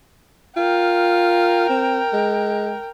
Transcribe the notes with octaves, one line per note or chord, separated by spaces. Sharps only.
F4 A#4 G5
C4
G#3